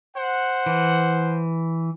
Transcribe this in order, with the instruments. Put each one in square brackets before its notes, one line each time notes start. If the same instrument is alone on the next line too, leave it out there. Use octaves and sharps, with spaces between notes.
[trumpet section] C5 F#5
[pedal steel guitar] E3